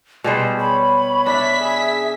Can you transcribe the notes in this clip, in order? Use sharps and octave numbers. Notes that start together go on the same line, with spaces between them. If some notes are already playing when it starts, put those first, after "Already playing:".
B2 G3 G#4 C5 A5
C#5 B5
D4 E5 B6
G#4